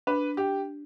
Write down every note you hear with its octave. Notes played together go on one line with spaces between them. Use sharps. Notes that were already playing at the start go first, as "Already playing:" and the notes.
D4 B4
G4